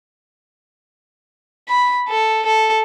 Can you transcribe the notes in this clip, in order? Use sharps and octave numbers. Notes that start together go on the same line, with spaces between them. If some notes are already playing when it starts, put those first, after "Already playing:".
B5
A4
A4